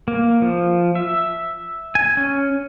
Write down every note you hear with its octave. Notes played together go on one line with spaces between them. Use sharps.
A#3
F3
E5
G#5
C#4